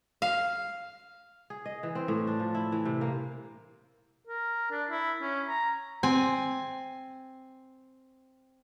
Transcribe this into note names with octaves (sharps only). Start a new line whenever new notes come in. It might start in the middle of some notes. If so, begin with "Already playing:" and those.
F5
G#4
D#5
E3
C4
A2
D4
F3
E4
E3
C3
A#3
A#4
D4
E4
C#4
A#5
C4 G#5